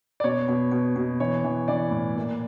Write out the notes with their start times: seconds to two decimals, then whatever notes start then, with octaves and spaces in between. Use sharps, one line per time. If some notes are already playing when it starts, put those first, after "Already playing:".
0.20 D5
0.24 B2 C#5
0.48 B2
0.72 B2
0.96 B2
1.20 E3 C#5
1.44 E3
1.68 E3 D5
1.91 A2
2.16 A#2